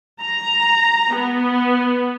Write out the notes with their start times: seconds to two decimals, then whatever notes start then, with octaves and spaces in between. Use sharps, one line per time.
0.22 A#5
1.15 B3